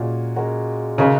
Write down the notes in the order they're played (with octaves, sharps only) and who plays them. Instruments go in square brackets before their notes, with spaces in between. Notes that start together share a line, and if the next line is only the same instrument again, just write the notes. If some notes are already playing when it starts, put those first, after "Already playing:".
Already playing: [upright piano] A#2 [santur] G#3 C#4 F#4 A#4
[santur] G#3 C#4 F#4 A#4
[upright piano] C#3 [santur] G#3 D#4 A#4